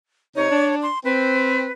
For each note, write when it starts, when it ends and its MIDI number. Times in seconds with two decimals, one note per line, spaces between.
0.36 0.49 48
0.36 0.49 63
0.36 0.75 73
0.50 0.87 62
0.83 0.99 84
1.05 1.68 60
1.05 1.72 71